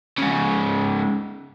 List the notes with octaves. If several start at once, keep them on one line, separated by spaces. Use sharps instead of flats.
G#2 C#3